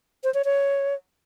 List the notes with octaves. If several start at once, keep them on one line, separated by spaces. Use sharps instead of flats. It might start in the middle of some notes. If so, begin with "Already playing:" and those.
C5
C#5
C#5